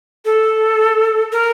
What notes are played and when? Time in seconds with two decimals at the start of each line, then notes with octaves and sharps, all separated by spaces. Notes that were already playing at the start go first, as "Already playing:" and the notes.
0.25 A4
1.32 A#4